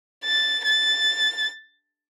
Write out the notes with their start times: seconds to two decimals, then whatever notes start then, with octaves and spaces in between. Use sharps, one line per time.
0.25 A6
0.65 A6